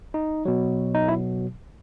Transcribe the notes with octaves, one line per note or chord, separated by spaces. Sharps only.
D#4
B2 F#3
D#4
E4